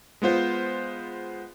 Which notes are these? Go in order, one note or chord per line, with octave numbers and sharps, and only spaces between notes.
G#3 B3 F4 C5